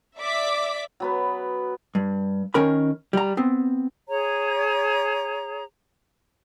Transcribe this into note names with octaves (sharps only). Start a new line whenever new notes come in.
D5 E5 D6 B6
F#3 B3 B4
G2
D#3 C#4 A#4 B5
G3 A#5
B3 C4
G#4 C#5 A#5